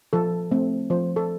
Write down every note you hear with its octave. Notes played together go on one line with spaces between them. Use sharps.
F3 A4
A3 C4
F3 C5
A4